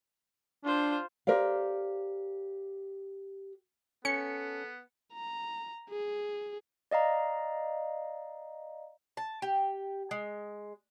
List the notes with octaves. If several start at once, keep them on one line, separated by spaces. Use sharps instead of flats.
D4 F4 C5
G4 A#4 C5 D5 F5
B3 C#4 A4 C#7
A#5
G#4
D5 D#5 F5 A#5
A5
G4
G#3